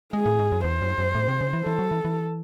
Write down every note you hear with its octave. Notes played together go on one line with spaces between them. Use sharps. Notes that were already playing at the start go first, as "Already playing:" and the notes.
G#3 G#4
A2
G#2
F#2
E2 C5
F#2
F#2
A2
C3
C#3
E3
E3 A4
F#3
E3
E3